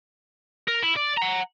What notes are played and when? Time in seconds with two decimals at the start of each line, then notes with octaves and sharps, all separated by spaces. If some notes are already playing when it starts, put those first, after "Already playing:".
0.68 A#4
0.83 E4
0.97 D5
1.18 F#5 A#5